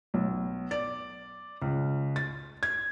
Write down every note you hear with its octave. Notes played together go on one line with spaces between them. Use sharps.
B1
D5
C#2
A6
G#6